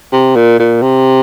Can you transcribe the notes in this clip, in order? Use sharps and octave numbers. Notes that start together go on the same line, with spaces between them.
C3
A#2
A#2
C3